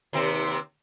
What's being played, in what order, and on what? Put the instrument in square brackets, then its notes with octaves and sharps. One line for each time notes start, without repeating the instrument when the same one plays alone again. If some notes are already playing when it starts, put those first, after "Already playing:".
[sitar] D#2 C3 C4